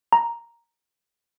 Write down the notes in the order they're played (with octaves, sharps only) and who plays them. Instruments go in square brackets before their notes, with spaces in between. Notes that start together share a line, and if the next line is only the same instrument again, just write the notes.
[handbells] A#5